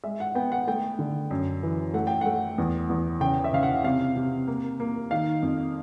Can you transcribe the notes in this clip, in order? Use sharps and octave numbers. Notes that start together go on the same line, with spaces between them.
G#3 E5
F#5
B3 G5
F#5
A3 G5
D3
F#2
E3
A3 F#5
G5
A3 F#5
E2
E2
C#3 G5
E5
C#3 F5
F#5
C3 F5
C3
A#3
A#3
D#3 F5
F2